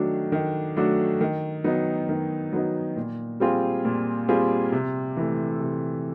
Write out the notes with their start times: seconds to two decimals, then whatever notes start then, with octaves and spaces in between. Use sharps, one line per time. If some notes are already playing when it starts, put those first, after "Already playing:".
Already playing: D#3 F#3 A3 D4 F#4
0.32 D#3
0.77 F#3 A3 D4 F#4
1.21 D#3
1.64 F#3 B3 D#4
2.09 D#3
2.53 F#3 B3 D#4
2.96 A#2
3.40 G3 C4 F4 G#4
3.85 A#2
4.28 G3 C4 F4 G#4
4.72 C3
5.17 E3 A3
5.60 C3